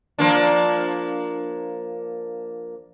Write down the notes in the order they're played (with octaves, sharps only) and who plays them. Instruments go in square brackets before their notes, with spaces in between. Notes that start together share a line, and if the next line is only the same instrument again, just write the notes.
[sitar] F3 A#3 D4